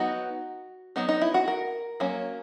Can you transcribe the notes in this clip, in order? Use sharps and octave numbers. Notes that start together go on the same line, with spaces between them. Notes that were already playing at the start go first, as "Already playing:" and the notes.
Already playing: F#3 B3 D#4 F#4
F#3 B3 D#4
D#4
E4
F#4
A#4
F#3 A#3 C#4